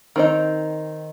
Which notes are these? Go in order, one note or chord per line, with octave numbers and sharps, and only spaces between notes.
D#3 C4 D#4